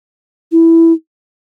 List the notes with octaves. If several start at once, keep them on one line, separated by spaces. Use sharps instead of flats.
E4